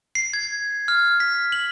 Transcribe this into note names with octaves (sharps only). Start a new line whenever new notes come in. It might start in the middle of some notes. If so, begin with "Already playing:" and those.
C7
G#6
F6
B6
F#7